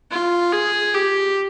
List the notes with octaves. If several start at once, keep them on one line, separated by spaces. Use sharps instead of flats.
F4
G#4
G4